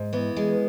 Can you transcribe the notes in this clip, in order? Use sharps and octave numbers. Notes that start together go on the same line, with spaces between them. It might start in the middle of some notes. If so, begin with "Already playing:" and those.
Already playing: G#2
E3 B3
G#3